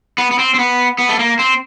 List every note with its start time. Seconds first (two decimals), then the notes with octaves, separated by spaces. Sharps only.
0.18 B3
0.31 B3
0.39 C4
0.54 C4
0.59 B3
0.98 B3
1.09 A3
1.19 A#3
1.39 C4